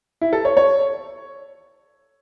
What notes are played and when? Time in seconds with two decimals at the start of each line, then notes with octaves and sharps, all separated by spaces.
0.21 E4
0.33 A4
0.45 C#5
0.57 C#5